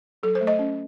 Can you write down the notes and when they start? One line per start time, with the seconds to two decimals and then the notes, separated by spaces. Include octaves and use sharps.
0.23 F#3 A4
0.35 C5
0.41 A3
0.47 D#5
0.59 C#4